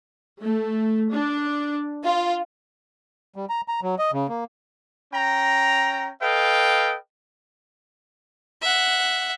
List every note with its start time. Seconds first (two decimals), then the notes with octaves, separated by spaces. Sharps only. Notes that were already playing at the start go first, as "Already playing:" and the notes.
0.39 A3
1.10 D4
2.05 F4
3.36 G3
3.49 A#5
3.68 A#5
3.82 F#3
3.99 D#5
4.13 C#3
4.29 A#3
5.13 C#4 G5 A#5
6.21 A4 B4 D#5 F5 G5
8.62 E5 F#5